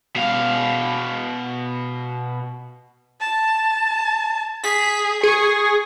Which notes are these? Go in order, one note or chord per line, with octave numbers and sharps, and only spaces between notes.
B2 F5
A5
G#4 B6
G#4 C#6